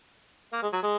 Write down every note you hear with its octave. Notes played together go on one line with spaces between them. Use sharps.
A#3
G#3
F#3
G#3